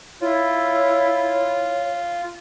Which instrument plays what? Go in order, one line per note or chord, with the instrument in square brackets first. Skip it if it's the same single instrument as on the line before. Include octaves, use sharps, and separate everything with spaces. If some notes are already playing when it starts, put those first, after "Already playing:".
[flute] E4 [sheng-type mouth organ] F4 [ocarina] C#5